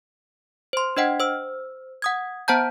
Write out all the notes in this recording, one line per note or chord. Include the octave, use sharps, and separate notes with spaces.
C5 C6
D4 C5 D#5 F#5 G5
C5 E6
F#5 D#6 G#6
B3 C5 F#5 A5 A#5 G6